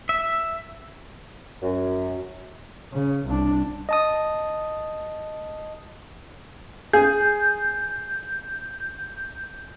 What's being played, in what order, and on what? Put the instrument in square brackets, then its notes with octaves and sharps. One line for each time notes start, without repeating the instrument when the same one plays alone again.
[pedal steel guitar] E5
[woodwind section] F#2
[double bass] C#3
C2 D4
[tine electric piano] D#5 A5 D#6
[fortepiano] G#4 [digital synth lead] G6